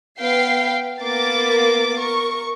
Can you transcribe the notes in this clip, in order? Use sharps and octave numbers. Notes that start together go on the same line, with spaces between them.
B3 B4 F5 G5 C7
A#3 B3 A#4 D6 A6
A#4 C#6